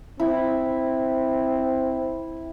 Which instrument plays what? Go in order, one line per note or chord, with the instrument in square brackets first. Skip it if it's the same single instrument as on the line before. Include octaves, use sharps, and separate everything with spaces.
[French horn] C4 [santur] E4